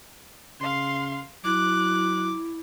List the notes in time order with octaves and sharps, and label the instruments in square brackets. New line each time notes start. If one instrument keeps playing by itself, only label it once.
[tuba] C#3 [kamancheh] F5 C6
[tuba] F#3 [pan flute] E4 [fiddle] D6 [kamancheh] F#6